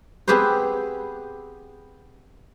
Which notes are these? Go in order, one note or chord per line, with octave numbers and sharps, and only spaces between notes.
B3 C4 G4 G#4 B4 C5